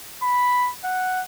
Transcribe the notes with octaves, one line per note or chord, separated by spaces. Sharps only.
B5
F#5